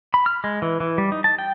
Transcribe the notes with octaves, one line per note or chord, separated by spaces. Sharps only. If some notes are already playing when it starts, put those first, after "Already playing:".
B5
F6
G#3
E3
E3
G3
D#4
A5
G5